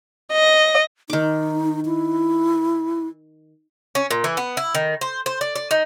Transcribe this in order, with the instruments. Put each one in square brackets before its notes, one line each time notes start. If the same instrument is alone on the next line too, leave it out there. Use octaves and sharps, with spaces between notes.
[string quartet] D#5
[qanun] D#3 D6 [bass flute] D#4
[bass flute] E4
[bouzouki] C#4
A#2
E3
B3
E4
D#3
C5
C5
D5
D5
D#4